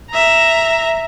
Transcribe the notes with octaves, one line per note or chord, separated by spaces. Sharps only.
E5 A#5